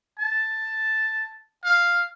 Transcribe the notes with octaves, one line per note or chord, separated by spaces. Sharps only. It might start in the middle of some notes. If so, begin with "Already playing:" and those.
A5
F5